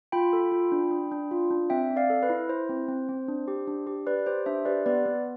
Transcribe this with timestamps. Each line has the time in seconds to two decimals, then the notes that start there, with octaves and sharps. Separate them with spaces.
0.12 F4 G5 B5
0.33 A4
0.52 F4
0.72 D4
0.91 D4
1.12 D4
1.31 F4
1.51 D4
1.70 C4 E5 G5
1.90 C4
1.96 D5 F5
2.10 A4
2.23 B4
2.30 E4
2.49 E4 C5
2.69 C4
2.88 C4
3.09 C4
3.28 D4
3.48 G4
3.67 D4
3.87 G4
4.07 G4 B4 D5
4.26 G4 C5
4.46 D4 C5 E5
4.65 G4 B4 D5
4.86 B3 B4 D5
5.06 B3